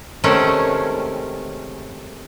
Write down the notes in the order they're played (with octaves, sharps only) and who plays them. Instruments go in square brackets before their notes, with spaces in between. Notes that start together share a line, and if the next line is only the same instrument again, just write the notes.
[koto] C3 D#3 G#3 A3 C#4